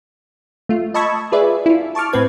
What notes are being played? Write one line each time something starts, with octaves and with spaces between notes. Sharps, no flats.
A3 F4
D#5 A5 B5 C#6 E6 G#6
F4 G#4 B4 D5 E5
E4 F4
A5 C#6 D6 F6
A2 C4 B4 G#6